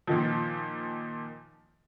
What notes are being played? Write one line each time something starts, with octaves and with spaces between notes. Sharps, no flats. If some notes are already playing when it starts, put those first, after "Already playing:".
A#2 D#3 F3